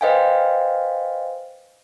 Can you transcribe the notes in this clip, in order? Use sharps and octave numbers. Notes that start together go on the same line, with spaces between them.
B4 C5 D#5 F5 G5 G#5